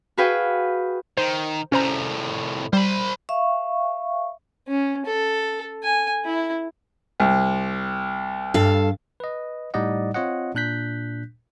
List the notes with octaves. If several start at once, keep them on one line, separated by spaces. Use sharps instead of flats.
F#4 G#4 B4 F5 G5
D#3 C5
C2 A2 C#4 C5 A#5
G3 C5 B5
E5 F5 C#6
C#4
A4
G#5
E4
C2
G2 A4 F5
B4 D#5
A2 G3 D#4 D5 D#5 F#5
C4 F4 C#5 D#5 F#5
A#2 D4 F#6 G6 B6